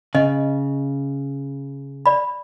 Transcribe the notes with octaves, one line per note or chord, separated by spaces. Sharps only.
C#3 D#5
D5 B5